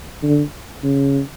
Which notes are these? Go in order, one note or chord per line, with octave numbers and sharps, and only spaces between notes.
D3
C#3